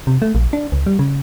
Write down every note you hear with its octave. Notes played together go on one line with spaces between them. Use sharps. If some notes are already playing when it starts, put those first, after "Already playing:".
C3
A3
A#1
D4
C#2
G3
C#3